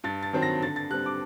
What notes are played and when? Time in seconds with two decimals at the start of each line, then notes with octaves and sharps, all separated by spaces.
0.04 G2 A6
0.23 A6
0.33 D#3 F#3 C4
0.42 A#6
0.62 D3 A6
0.76 A6
0.91 G3 C4 F#6
1.06 D6